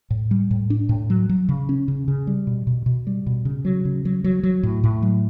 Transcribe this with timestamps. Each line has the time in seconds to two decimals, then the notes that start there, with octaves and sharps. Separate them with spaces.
0.10 A2
0.31 G3
0.51 A2
0.70 D4
0.89 A2
1.10 F#3
1.29 F#3
1.49 C#3
1.69 C#4
1.88 C#3
2.08 C#3
2.27 G3
2.47 B2
2.67 B2
2.86 B2
3.07 G3
3.26 B2
3.45 C#3
3.65 F#3
3.85 C#3
4.05 F#3
4.24 F#3
4.43 F#3
4.63 A2
4.84 A2
5.02 F#3